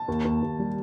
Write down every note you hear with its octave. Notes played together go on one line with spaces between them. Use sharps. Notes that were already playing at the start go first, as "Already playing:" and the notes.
Already playing: A5
D#2
D#2
D#2
G3